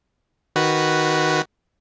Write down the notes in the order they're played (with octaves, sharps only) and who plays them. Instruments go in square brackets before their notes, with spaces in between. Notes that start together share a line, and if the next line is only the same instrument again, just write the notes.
[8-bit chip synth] D#3 F#4 B4